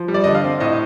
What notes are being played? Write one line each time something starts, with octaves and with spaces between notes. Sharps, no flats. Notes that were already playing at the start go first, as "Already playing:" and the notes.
Already playing: F3
G3
D5
D3 D#5
F5
C4
A2 D#5